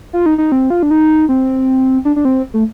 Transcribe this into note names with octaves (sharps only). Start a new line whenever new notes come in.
F4
D#4
D#4
C4
F4
D4
D#4
C4
D4
D4
C4
A3